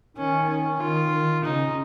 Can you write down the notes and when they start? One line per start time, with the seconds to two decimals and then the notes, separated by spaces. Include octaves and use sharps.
0.17 D#3 C#4
0.49 C#4
0.80 D#3 F4
1.12 D#3
1.44 C#3 D#4